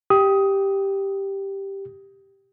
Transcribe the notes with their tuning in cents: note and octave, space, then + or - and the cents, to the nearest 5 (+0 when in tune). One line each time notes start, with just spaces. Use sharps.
G4 +0 D#6 +15